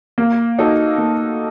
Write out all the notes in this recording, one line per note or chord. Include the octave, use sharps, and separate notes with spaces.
A#3
D#4 F#4 A4
A#3